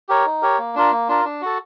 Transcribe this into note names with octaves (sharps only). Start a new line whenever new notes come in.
G4 A#4 C#5
D#4
G4 A#4 C#5
A#3
D4 F4 A#4
A#3
D4 F4 A#4
D4
F#4 A4